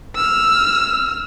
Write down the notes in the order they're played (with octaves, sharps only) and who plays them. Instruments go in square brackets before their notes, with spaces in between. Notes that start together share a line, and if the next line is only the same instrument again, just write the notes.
[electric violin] E6 F6